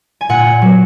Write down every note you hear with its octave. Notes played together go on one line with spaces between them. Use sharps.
G#5
A#2 F#5
A#2
F#3